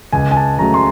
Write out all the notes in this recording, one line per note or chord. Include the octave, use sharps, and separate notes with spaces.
C#2 G#5
G#5
A5
C#3 F#3 A3 A#5
C6